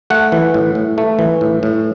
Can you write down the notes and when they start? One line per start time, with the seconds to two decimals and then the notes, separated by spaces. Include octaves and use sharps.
0.10 A3 F#5
0.32 E3
0.54 A2
0.75 A2
0.98 A3
1.19 E3
1.41 A2
1.63 A2